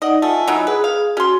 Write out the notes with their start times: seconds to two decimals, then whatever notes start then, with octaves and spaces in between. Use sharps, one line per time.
0.02 D#4 D5 D#5 F#5
0.22 A3 F4 D#5 G#5
0.48 F#3 D#4 E4
0.67 G#4 B4 D#6
0.84 F5
1.17 C#4 F#4 C6